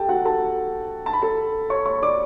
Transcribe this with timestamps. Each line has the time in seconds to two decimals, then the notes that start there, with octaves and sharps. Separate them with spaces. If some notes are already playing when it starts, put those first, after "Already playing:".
Already playing: G4 A4 G5 A5
0.08 F#4 F#5
0.25 A4 A5
1.06 A5
1.13 B5
1.22 A4 A5
1.70 C#5 C#6
1.86 C#5 C#6
2.02 D5 D6